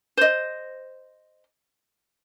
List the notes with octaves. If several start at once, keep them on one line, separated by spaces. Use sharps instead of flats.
C5 D#5